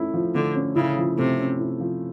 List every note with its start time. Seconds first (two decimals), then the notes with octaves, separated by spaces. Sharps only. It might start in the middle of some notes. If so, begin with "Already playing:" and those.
Already playing: A3 C#4 E4
0.14 F3
0.35 D3 A3
0.55 C#4
0.76 C#3 E4
0.97 F3
1.18 C3 A3
1.38 C#4
1.60 E4
1.80 F3